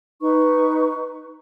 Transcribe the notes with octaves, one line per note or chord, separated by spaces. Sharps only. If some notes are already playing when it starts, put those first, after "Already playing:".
D#4 B4 C#6